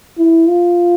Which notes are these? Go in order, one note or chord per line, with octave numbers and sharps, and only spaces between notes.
E4
F4